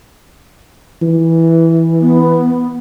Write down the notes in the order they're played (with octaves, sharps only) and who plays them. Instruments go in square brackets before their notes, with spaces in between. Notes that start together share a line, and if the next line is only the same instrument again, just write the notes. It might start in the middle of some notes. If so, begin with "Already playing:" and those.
[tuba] E3
[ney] B3